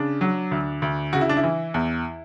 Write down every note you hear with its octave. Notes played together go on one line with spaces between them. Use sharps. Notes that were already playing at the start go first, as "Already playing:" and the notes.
Already playing: C#3 D4
F#3
D2
D2
C#3 F#4
E4
D4
E4
E3
E2